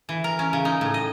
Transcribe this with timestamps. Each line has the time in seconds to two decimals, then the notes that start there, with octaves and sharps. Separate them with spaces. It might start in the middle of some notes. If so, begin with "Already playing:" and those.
0.09 E3
0.24 A#4
0.39 C#4
0.53 C#3
0.65 D#4
0.81 A2
0.94 D#5